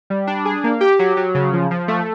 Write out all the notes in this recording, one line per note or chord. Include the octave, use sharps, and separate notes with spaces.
G3
D4
G#4
A#3
G4
F#3
F#3
C#3
F3
F3
A3